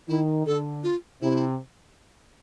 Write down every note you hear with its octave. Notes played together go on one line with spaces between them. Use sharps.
D#3 E4
D3 A4
F4
C3 E4